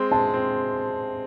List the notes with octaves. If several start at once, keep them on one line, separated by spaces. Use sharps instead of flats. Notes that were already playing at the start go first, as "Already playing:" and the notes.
Already playing: G#3 C4
G#3 A5
C4